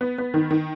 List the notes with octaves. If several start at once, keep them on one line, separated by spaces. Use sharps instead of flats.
B3
B3
D#3
D#3